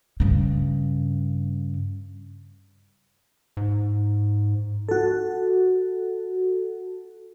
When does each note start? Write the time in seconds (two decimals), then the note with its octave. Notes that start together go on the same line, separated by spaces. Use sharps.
0.20 G2 C#3
3.57 G#2
4.89 F#4 A4